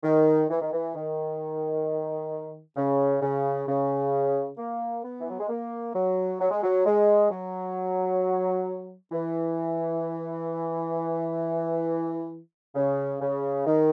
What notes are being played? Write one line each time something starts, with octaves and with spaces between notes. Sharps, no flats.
D#3
E3
D#3
E3
D#3
C#3
C#3
C#3
A#3
B3
E3
F#3
G#3
A#3
F#3
F#3
G#3
F#3
G#3
F#3
E3
C#3
C#3
D#3